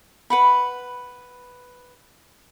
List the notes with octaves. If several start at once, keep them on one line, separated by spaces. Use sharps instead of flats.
B4 F#5 B5